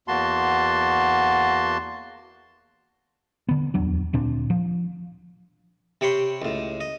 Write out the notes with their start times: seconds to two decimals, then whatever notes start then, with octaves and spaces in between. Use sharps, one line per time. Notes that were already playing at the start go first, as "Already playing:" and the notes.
0.08 E2 A#3 F#4 A5 C6
3.49 D3 B3
3.74 D1 E2 F#3 D4
4.13 D2 A#2 C4 D4
4.50 F3
6.01 C3 G4 C#5 B5 C6
6.42 C#2 A2
6.80 D#5